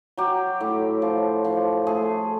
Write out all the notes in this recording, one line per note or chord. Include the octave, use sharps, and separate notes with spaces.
F#3 G4
A2
F3
F3
A3 G#4